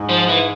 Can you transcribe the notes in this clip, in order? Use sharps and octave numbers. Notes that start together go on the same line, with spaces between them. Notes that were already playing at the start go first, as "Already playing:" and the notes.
Already playing: G#2
F3
E3